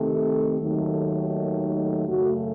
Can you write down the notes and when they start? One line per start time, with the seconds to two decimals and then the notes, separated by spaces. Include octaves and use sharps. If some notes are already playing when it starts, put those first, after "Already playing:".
Already playing: C3 D#3 A3 A4
0.59 D#2 D#3 F#3 A3
2.07 F#2 C#3 A3 F#4